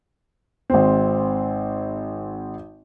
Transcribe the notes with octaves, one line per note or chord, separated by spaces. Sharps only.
G#1 C4